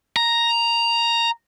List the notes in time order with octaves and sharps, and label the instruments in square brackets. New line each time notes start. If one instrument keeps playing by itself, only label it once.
[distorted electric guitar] A#5